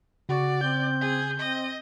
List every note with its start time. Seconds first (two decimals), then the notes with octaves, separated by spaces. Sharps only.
0.29 C#3 F#4 D5
0.61 C4 G6
1.01 G#4
1.39 C4 D#5